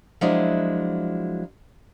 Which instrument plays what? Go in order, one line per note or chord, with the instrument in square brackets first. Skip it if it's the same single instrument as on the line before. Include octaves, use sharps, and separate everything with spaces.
[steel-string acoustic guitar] F3 F#3 G#3 D4 E4